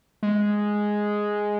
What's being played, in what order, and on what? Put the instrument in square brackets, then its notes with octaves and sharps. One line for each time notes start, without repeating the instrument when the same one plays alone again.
[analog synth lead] G#3